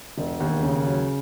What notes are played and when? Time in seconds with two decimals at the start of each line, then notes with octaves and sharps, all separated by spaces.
0.18 E1
0.40 D#2
0.63 C#3
0.85 F#3